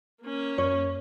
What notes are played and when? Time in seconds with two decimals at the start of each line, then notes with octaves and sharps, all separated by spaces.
0.22 A#3 C#4
0.58 F#2 C#5